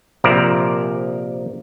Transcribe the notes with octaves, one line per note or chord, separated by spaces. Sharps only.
A#1 C3 F3 A#4 D5 E5